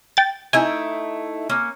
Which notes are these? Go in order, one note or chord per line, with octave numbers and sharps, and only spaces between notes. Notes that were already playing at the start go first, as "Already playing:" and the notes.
G5 A6
A3 D#4 E4 G#5
A#3 C#4